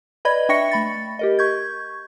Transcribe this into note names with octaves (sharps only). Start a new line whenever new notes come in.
B4 D5 D#5 B5 G#6
D4 E5 G5 C#6 A#6 C#7
A3 B5 A6
G4 A#4 D#5
C#6 G6 G#6